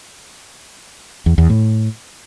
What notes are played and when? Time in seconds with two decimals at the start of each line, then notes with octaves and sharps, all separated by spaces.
1.26 E2
1.38 E2
1.50 A2